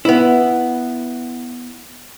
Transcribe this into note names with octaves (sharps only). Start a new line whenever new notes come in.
B3 E4